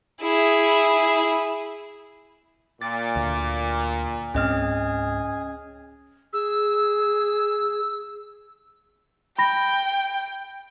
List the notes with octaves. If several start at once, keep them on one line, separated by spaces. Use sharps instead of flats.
E4 G#4
A#2 D6 A6
D2
C#2 G#2 C4 C#4 G#4 D#5 F6
G#4 E6
G5 B5 A#6